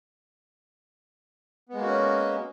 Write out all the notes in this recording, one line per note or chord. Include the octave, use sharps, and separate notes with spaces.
G#3 A#3 B3 C#4 F#4